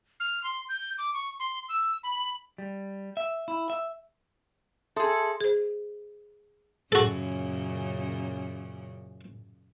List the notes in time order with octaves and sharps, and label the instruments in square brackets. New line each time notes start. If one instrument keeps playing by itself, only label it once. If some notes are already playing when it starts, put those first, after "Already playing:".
[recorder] F6
C6
G6
D6
C#6
C6
E6
B5
B5
[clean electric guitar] G3
E5
E4
E5
[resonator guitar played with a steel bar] G#4 A4 [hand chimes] E5 C6 D#6
[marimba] G#4 C5
[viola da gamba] F#2 A#2 C#3 [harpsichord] F#4 A4